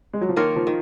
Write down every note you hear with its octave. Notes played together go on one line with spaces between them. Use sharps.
G#3
F#3
F3
D#3 A#3 F4 A#4 C#5
F3
D#3